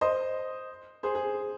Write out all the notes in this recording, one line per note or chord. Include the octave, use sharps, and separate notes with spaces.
C5 D#5
G#4 C5
G#4